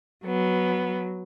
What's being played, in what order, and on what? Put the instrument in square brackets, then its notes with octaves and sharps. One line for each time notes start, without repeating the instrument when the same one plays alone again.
[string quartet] F#3 B3